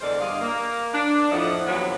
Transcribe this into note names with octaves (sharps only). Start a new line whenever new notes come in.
E2 D3 G#3 A#4 C5 D5
G2 D5 D#5 F5
A#3
D4
F2 A2 F3 D#4 E4 F#5
D#2 G#2 F3 F#3 B3 B4